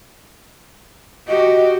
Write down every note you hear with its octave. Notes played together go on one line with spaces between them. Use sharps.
F#4 G4 D#5